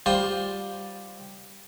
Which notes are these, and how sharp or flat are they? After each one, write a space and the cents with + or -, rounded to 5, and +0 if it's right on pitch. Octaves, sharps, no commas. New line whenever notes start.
G3 +0 F4 +15 C5 +0